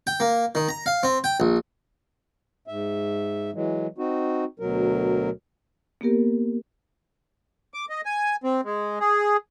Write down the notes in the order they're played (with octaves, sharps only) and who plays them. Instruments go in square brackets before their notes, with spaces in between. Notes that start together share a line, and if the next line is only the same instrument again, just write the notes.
[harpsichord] G5
A#3
D#3
A#5
F5
C4
G5
A#1
[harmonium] G#2 E5
E3 F#3 G#3
C4 D#4 F#4
D2 B2 F#3 A#4
[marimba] A#3 B3 G4 A#4
[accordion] D6
D#5
G#5
C4
G#3
G#4